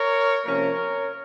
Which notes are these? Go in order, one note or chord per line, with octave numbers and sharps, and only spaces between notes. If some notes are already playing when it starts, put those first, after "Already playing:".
Already playing: A#4 C#5
C3 F3 A#3 C#4 A#4 C#5